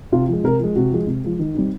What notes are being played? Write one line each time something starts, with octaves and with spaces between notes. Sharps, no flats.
C3 F4
F3 G#3
C3 A#4
F3 G#3
C3 F#4
F3 G#3
C3
F3 G#3
D#3
G3 C4 D#4